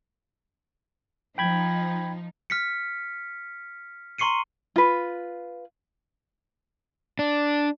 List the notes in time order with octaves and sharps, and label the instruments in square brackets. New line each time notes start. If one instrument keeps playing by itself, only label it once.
[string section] F3 D#4 [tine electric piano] G5 B5 G#6
[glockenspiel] F6 B6 C#7
A#5 C6 C#6 C7 C#7 D#7
[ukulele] F4 B4
[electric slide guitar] D4